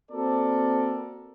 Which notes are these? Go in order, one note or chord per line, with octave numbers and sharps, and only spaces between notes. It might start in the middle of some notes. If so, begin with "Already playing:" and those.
A#3 C4 F#4 A4 A#4 D5